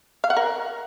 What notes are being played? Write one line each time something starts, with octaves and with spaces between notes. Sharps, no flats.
F5
F#5
A#4